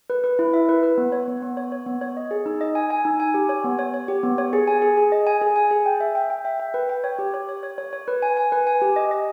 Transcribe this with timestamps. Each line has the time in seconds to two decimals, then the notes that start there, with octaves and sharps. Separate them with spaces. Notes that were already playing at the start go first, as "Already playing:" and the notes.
0.10 B4
0.24 B4
0.39 E4
0.54 E5
0.69 B4
0.83 B4
0.98 B3
1.12 C#5
1.28 B3
1.42 B3
1.57 C#5
1.72 C#5
1.86 B3
2.01 C#5
2.17 D#5
2.31 G#4
2.46 D#4
2.61 D#5
2.75 G#5
2.91 G#5
3.05 D#4
3.20 G#5
3.34 G4
3.49 C#5
3.64 B3
3.79 C#5
3.94 C#5
4.08 G4
4.23 B3
4.38 C#5
4.53 G#4
4.68 G#5
4.82 G#4
4.97 G#4
5.12 D#5
5.27 G#5
5.42 G#4
5.56 G#5
5.71 G#4
5.86 G5
6.00 E5
6.15 G5
6.30 G5
6.45 E5
6.60 G5
6.74 B4
6.89 G5
7.04 C#5
7.19 G4
7.34 C#5
7.49 C#5
7.63 C#5
7.78 C#5
7.93 C#5
8.08 B4
8.22 G#5
8.37 G#5
8.52 B4
8.67 G#5
8.82 G4
8.96 D#5
9.11 D#5